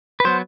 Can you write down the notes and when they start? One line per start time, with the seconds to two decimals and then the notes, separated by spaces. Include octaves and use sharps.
0.20 B4
0.25 F#3 B3 C5